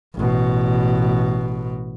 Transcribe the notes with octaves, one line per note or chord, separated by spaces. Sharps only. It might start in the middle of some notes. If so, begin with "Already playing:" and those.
A1 B2